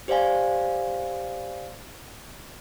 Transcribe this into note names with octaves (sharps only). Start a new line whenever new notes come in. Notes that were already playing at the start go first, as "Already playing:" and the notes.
G4 C5 D5 F5 G#5